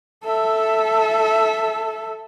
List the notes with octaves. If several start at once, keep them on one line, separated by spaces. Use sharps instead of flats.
A4 E5